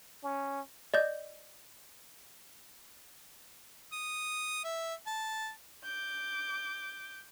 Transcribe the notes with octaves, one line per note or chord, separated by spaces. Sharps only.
C#4
D5 D#5 G6
D#6
E5
A5
D6 G6